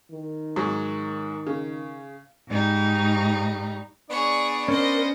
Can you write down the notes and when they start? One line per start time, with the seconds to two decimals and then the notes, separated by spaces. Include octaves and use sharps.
0.11 D#3
0.56 G#2 F#3
1.47 C#3
2.48 G#2 G3 D#4
4.10 B3 D4 G#4 C#5 D5
4.68 C#4 A#4 C5 D#5